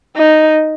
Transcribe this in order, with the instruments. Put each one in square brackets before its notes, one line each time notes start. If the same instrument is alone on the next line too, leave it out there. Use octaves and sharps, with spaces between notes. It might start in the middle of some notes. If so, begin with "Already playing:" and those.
[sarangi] D#4